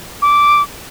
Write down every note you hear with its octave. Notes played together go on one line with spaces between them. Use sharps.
D6